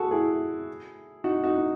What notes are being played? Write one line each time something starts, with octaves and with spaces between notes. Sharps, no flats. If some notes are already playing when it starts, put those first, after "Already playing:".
Already playing: F#4 G#4 A4
E4 G#4
D#4 F#4
D#4 F#4
D#4